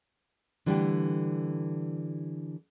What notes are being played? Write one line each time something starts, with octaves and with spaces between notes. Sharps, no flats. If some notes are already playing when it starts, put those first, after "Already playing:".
D3 E3 G3 A3 D4 G4